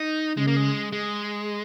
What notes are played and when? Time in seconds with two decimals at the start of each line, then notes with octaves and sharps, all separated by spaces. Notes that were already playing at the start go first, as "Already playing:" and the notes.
Already playing: D#4
0.37 C#3 G#3
0.48 A#3
0.56 G#3
0.92 G#3